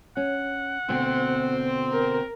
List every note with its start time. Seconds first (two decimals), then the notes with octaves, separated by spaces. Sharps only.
0.17 C#4 F#5
0.89 D2 B2 C4
1.92 A#4